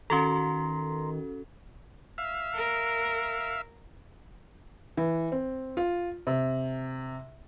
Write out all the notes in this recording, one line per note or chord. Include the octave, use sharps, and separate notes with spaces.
D#3 C#4 F#4 A4 A#5 C6
E5 F5
A#4
E3
C4
F4
C3